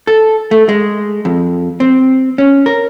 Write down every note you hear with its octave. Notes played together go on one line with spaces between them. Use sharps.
A4
A3
G#3
F2
C4
C#4
A#4